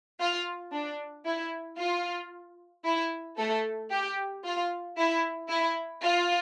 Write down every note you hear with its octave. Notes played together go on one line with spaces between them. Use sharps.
F4
D4
E4
F4
E4
A3 A4
G4
F4
E4
E4
F4